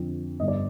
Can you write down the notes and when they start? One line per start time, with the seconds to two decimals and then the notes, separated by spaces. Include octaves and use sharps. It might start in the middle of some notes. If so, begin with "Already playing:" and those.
Already playing: F2 D3 F3
0.40 G1 G2 D3 D#5
0.48 D5